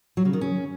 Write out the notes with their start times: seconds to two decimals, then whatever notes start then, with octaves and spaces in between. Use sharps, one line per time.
0.17 F#3
0.25 C#3
0.33 D#3
0.41 C#4